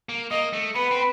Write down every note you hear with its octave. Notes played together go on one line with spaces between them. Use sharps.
A#3
A#3 D#5
A3
B3 B4
C4